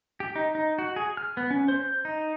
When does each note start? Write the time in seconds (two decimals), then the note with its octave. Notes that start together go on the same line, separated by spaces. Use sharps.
0.20 G4
0.36 D#4
0.55 D#4
0.79 F#4
0.96 G#4
1.17 F6
1.37 B3
1.51 C#4
1.68 C5
1.80 G6
2.05 D#4